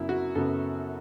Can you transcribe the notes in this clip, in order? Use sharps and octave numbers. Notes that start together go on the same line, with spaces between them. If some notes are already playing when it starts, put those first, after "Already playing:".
Already playing: F#2 C#3 F#3 B3 E4
F#4
F#2 C#3 F#3 B3 A4